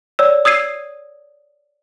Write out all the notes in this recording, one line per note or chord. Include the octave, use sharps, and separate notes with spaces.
C#5 D5 E6
D#6 E6 G#6 C7 D#7